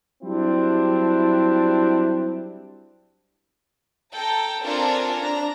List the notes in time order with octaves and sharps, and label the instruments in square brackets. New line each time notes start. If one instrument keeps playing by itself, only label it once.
[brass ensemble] F#3 G3 C4 D4 E4
[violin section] A4 G5 A#5
C4 D4 F4 A4 A#4 G#5
D4 A#5